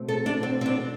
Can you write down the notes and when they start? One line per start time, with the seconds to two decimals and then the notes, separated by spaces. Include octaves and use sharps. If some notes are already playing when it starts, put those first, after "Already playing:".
Already playing: B2 A3 C4
0.08 A4
0.26 D4
0.43 C4
0.61 C4
0.66 D4